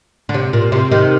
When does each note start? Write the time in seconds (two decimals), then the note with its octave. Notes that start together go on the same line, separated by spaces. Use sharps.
0.29 D3
0.34 C3
0.53 A#2
0.72 C3
0.91 C3 D#3